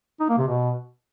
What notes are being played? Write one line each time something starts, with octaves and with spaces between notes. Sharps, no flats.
D#4
A#3
C3
B2